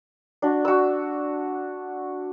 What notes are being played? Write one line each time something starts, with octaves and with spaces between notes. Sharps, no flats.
D4 F#4
F#4 E6